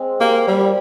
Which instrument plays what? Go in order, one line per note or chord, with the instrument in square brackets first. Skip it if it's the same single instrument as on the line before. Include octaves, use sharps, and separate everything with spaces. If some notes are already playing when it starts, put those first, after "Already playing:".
Already playing: [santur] G#3 C4
[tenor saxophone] A#3 [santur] G4
[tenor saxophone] G3
[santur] G4